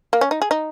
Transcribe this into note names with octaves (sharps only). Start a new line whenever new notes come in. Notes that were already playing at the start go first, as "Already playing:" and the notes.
A#3
C#4
D#4
G#4
D#4